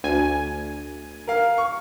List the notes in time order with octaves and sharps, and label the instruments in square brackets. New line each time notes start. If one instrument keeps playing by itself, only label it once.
[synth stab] D2 G#5
[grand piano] A#4 F5
C#6